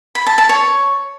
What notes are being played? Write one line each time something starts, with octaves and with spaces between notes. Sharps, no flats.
B5
A5
A5
C#5